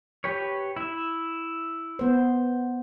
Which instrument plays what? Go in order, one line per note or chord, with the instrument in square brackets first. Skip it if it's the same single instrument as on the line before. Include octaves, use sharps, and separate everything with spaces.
[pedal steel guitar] G4 B4 C#5
E4 E5
[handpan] B3 C5